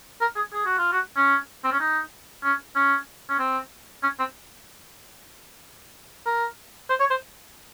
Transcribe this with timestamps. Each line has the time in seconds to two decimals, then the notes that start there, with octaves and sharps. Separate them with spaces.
0.21 A#4
0.36 G#4
0.53 G#4
0.65 F#4
0.78 F4
0.92 F#4
1.16 C#4
1.64 C4
1.72 C#4
1.80 D#4
2.43 C#4
2.76 C#4
3.29 C#4
3.39 C4
4.03 C#4
4.19 C4
6.26 A#4
6.89 C5
7.00 C#5
7.10 C5